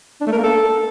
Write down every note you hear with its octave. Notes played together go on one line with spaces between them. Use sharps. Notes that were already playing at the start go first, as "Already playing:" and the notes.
D4
A3
A#4
A#3
A4